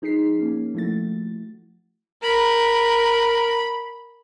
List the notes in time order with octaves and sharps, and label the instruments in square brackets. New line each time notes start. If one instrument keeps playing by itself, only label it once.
[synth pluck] F3 D#4 G#4 B6 C7
A#3 C#4
F3 A3 E4 F#4 A6
[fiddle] A#4 [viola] B5